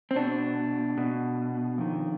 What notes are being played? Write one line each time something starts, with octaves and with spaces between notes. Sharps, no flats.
C4
B2 D4
B2
F2 D#3